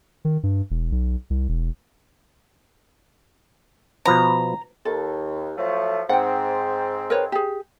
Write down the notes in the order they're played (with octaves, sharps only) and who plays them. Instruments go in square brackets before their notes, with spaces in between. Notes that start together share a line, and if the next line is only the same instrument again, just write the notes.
[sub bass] D#3
G2
E1
B1
C2
E1
[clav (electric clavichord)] B2 F3 B4 [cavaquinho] A#5
[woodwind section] D#2 [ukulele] A4
[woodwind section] F3 F#3 A3
[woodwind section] G#2 C4 [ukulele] F#5 G5
[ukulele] A#4 B4 C#5
G4 G#4